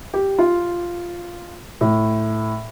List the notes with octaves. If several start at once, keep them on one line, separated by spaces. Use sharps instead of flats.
G4
F4
A2